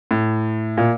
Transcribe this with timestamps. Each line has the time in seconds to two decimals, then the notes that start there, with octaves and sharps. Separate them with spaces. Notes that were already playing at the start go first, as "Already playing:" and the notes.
0.11 A2
0.77 A#2